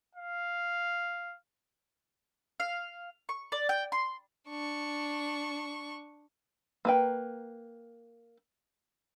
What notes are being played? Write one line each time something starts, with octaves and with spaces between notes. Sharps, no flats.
F5
F5
C#6
D5
G5
C6
D4 C#6
A#3 B4 G5